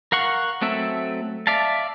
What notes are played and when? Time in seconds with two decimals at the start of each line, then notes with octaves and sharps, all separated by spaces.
0.12 A#4 F5 F#5 C#6
0.62 F#3 A3 C4 E5
1.47 D5 E5 F5 A5